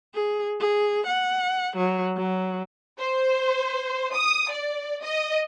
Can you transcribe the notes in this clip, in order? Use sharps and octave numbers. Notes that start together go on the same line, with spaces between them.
G#4
G#4
F#5
F#3
F#3
C5
D#6
D5
D#5